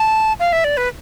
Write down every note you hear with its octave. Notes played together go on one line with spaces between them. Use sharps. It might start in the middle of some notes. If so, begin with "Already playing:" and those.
Already playing: A5
F5
E5
D5
B4